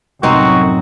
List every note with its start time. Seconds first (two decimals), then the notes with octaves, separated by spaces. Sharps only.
0.23 C2 F#2 A2 C3 C4 D#4 F#4